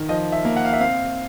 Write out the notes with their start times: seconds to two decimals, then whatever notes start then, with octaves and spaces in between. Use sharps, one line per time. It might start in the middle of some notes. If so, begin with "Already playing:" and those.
Already playing: D#3
0.09 F3 D#5
0.32 E5
0.45 A#3
0.57 F#5
0.65 F5
0.73 E5
0.80 C4 F5